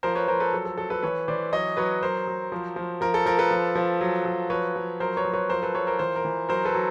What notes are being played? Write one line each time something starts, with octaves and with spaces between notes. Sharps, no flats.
F3 A#4 C5
B4 C#5
F3 A#4 C5
A4 B4
F#3 A4
A4
F#3 A4
A4 B4
E3 B4 C#5
E3 C5 D5
F#3 C#5 D#5
F#3 B4 C#5
F#3 A#4 C5
F#3
F3
F3
F3 A#4
A4
F3 A#4
A4 B4
F3
F3
F#3
F#3
F3 B4 C#5
F3
F#3 A#4 C5
B4 C#5
F#3
B4 C#5
F3 A#4 C5
A4 B4
F3 B4 C#5
A#4 C5
E3 A#4 C5
A#4
E3
F#3 A#4 C5
A4 B4
F#3